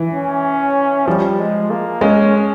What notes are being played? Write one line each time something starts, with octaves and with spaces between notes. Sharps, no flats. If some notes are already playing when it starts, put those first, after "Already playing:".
Already playing: E3
C#4
F3 G3
G#3
A#3
G#3 C#4